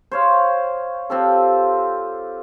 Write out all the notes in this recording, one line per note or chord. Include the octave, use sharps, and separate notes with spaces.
C5 C#5 F5
C4 F4 G4 A4